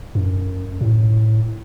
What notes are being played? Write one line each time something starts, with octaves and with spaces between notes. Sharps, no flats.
F#2
A2